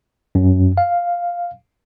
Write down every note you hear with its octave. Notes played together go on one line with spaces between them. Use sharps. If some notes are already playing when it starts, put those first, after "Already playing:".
F#2
F5